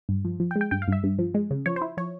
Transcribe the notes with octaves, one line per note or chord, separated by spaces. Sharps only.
G2
F3
F3
G5
G#3
G5
G2 G5
F5
G2 E5
G2
F3
G#3
C#3
F3 C#5
C5
E4
F3 C#5